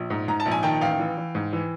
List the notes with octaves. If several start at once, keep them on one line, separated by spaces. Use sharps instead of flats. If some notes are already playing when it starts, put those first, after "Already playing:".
Already playing: A#1
G#2
G#2 A#5
A5
A#1
G#5
D#3 G5 A5
A1 F5 G5
E3
E3
G#2
E3